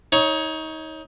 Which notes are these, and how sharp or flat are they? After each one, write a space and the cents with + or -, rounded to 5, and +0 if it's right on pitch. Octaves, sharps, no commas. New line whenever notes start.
D#4 +25 C#5 +0